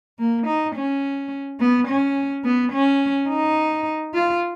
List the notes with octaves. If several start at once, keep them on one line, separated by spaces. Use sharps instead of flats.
A#3
D#4
C#4
B3
C#4
B3
C#4
D#4
F4